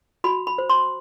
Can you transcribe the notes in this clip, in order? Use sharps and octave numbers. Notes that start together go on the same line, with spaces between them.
F#4 B5
B5
C5
C6